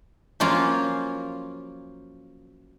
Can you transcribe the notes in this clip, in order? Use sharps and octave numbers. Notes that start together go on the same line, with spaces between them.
F3 F#3 A#3 C#4 F4 A#4